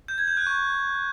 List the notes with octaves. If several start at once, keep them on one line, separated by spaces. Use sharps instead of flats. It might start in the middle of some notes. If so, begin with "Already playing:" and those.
G6
G#6
G6
F#6
C#6